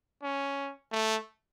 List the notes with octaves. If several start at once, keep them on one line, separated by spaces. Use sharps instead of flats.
C#4
A3